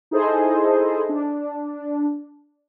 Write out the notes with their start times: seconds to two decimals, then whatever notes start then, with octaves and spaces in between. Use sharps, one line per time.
0.11 D#4 E4 G#4 A4 C5 D#5
1.09 D4